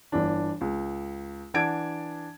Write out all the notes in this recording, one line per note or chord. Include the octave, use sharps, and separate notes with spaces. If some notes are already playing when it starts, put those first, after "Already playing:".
G1 E3 D4
C#2
E3 D4 F#5 A5 G#6 D7